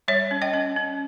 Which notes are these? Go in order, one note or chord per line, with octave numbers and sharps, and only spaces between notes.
G3 C#5 E5
C#4
D#5 G5
C#4
C#4